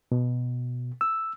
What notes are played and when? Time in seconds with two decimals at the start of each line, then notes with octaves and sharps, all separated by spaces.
0.12 B2
1.01 E6